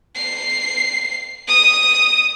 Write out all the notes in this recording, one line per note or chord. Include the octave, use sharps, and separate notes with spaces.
C7
D#6